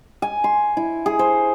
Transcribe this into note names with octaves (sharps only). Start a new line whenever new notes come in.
G#5
C6
E4
G#4
C5